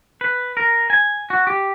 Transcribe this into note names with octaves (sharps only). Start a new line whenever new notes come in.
B4
A#4
G#5
F#4
G4